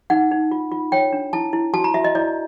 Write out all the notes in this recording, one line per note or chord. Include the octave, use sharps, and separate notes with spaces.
D#4 F#5
D#4
F4
F4
C#5 G5
D4
E4 A5
E4
F#4 A5
A#5
F#4 E5
D#5
E4 D5